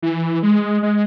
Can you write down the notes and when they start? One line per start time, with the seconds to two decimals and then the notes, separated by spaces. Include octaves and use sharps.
0.02 E3
0.43 G#3
0.83 G#3